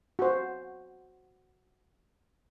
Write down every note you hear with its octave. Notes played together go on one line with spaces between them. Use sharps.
F#4 C5